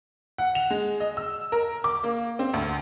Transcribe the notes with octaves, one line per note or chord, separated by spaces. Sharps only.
F#5
F7
G#3
D#5
E6
A#4
D6
A#3
C4
D2